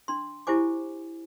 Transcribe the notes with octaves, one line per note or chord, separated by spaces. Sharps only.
D4 C6
E4 G4 C5 G#5 D6